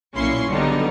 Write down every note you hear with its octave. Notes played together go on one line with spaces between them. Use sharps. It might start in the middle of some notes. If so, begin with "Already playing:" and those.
B1 A#2 C#4 E4 C6 C#6
D3 F#3 G3 B3 D#4